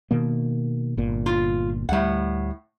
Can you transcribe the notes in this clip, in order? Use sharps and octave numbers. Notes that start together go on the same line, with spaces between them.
B2 D#3 A#3
G1 A#2
F4
D2 A2 G3 F#5